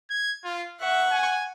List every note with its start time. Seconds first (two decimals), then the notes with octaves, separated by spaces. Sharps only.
0.10 G#6
0.44 F4
0.81 E5 F#5 C#6
1.11 G#5